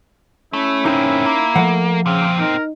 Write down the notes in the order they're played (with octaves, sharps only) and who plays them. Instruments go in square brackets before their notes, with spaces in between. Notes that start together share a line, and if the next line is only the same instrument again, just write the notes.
[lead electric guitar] A3 [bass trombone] C#4 [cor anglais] E4
[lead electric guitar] A#3 C4 [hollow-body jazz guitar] D#4
[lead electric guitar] A#3
[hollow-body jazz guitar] F3 F#5 [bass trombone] A3
[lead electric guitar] A#2 C4 [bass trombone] C#3 [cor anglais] F5
[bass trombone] D#4 [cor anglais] A#4